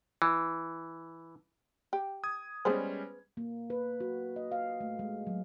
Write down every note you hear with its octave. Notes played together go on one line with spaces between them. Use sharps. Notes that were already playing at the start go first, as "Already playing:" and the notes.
E3
G4
D#6 G#6
G3 G#3 B3 C#4 G#4 C5
A#3
B4
F#4
D#5
F5
A3
G#3
F#3